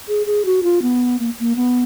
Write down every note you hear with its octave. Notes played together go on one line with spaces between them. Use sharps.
G#4
G#4
F#4
F4
B3
A#3
A#3
B3